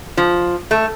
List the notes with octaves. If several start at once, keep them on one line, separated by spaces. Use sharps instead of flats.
F3
A3